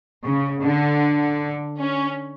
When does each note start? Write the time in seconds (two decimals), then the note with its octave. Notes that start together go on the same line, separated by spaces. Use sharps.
0.23 C#3
0.62 D3
1.81 C#4